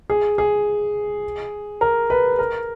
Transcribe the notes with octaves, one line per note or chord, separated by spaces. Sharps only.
G#4
G#4
A#4
B4
A#4